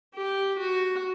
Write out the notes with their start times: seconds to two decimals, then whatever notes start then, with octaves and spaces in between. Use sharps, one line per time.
0.15 G4
0.60 F#4